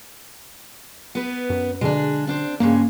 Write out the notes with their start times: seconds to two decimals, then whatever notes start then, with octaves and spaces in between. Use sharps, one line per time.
1.15 B3 B4
1.50 F#2
1.81 B2 D3 G#3 D4
2.27 C4 D4 C5
2.60 G2 C#3 G#3 A#3